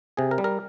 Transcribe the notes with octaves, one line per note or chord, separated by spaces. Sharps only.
C3 G#4
A#4
G3
A#4